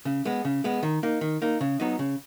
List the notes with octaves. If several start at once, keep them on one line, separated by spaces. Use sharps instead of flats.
C#3
G#3 B3
C#3
G#3 B3
D#3
A#3 D#4
D#3
A#3 D#4
C#3
F#3 B3 D#4
C#3